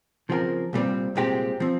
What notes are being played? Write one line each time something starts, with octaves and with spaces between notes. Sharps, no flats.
C#3 F3 C4 G4 A#4
C2 A#2 G3 C4
C2 A#2 G#3 C4 G4
F3 C4